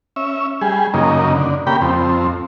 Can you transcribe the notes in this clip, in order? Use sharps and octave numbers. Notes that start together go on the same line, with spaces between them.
C#4 E5
G3 G#4
F#2 C#3 A#3 D#4
D3
C#3 A#3 G4 G5 B5
F2 C4